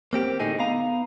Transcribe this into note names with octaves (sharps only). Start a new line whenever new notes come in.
A#3 C4 G4
A2 D3 D#4 G#4
B3 F5 A#5